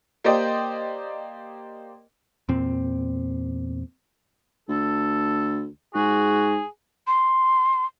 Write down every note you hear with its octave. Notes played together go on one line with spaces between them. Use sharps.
A#3 G4 C5 D5 D#5 G5
E2 A#2 C4
D2 A4
G#2 F#4 G#4
C6